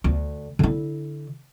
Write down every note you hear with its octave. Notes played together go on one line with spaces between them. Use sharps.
D2
D3 E4